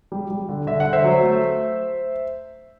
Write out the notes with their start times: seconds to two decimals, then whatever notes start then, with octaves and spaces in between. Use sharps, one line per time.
0.12 G3
0.30 G3
0.49 D3
0.67 D3 E5
0.80 F#5
0.85 D3
0.93 C5 E5
1.04 F#3
1.22 A3